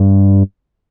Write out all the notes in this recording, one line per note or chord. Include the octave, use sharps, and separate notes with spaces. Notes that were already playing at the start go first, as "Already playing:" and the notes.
Already playing: G2